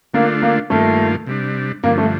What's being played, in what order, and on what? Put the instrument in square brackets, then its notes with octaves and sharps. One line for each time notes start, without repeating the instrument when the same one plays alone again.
[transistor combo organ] D3 A3 D4 F4 [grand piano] A#3
[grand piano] A#3
[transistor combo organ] G2 D#3 A#3 F4 [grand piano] A3
[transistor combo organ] C3 G3 D4
[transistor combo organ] G2 D3 F3 [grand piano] A#3
[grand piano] A3